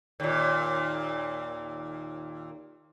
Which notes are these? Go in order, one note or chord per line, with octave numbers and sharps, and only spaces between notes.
D#2 A#2